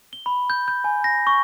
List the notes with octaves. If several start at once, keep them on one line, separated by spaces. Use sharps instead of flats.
G7
B5
G6
G6
G#5
A#6
C#6